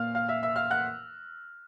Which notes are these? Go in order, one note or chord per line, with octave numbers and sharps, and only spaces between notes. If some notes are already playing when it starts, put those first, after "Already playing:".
Already playing: A#2 F5 F6
F5 F6
E5 E6
E5 E6
F5 F6
F#5 F#6